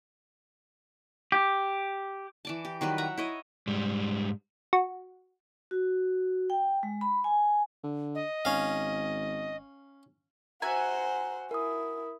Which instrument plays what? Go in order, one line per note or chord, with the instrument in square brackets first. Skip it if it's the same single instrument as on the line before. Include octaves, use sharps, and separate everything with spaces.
[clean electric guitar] G4
[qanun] E3 D5 A5
G4
D#3 F#3 G3 B4
E5 F#5 A#5
E4 C#5 D#5
[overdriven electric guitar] G#2 G3
[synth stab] F#4
[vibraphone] F#4
G5
G#3
B5
G#5
[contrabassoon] D3
[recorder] D#5
[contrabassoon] G#1 [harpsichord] C#4 F5
[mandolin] F#4 E5 G#5 [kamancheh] C5 F#5 [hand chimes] A#5
[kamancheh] E4 [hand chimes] A#4 D#6